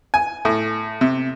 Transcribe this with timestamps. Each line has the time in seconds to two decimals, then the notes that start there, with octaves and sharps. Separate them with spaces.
0.14 G#5
0.45 A2
1.01 C3